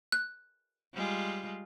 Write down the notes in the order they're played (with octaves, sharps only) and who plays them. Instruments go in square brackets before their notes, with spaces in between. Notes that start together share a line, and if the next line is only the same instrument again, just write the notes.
[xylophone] F#6
[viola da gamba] G3 G#3 F4